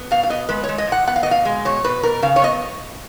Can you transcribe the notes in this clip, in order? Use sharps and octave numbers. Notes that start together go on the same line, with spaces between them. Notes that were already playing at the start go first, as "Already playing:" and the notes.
Already playing: B3
B2 F5
F5
B3 D#5
G#3 B4
C#5
G#3
D#5
A#2 F#5
B3 F#5
F5
D#5
B2
F5
G#3
B2 C#5
B2 B4
B2 A#4
C#3 F5
C#5
B3 D#5